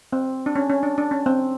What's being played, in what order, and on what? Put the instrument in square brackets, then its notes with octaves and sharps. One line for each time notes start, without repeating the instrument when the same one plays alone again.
[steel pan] C4
D4
C#4
C#4
D4
D4
C#4
C4